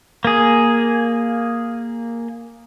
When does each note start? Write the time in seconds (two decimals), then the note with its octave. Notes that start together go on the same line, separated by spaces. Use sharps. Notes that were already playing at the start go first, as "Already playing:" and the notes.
0.25 A#3 G#4